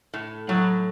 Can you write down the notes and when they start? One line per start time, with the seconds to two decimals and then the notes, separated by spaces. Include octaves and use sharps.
0.14 A2
0.48 A2 F#3